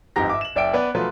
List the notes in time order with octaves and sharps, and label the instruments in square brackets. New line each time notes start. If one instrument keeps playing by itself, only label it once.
[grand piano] G1 F2 G#2 G4 A#5 A#6
E5 D6
E7 F#7
F#1 D5 E5 G5 D7
B3 B4 D5
F3 F#3 A3 F4 B4